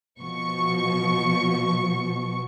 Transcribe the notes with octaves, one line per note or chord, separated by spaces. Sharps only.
B2 F3 C#6